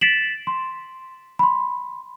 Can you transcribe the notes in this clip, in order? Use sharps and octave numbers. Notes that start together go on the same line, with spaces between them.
A6 B6 C7 D7 E7 F#7
C6
B5 C6